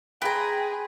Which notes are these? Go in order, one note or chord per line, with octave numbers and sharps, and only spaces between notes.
G#4 B4 G5 A#5 C6